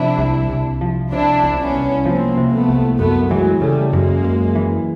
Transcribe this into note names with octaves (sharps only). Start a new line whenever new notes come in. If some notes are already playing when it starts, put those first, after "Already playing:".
Already playing: C3 F3 D4 E4
C2
C2
F3
C3 D4 E4
C2
B3 C#4
C2
F3 A#3 C4
C3
A3 B3
C2
F#2 A3 B3
E3 F#3 G#3
C#3 G3 A3
F#2 G#3 A#3
F#2
E3